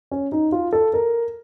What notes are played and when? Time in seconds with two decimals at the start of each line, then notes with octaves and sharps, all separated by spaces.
0.11 C#4
0.32 D#4
0.52 F4
0.73 A4
0.93 A#4